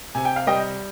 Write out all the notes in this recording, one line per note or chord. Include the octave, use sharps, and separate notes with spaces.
C3 G#5
G5
F5
G3 D#5 G5